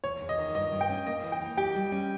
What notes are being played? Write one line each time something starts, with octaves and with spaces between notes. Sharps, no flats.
E2 C#5
E2
D#5
D#3
G2 D#5
G2
G5
C#4
A#3 D#5
E3
G5
E3
G4 G5
G3
C#4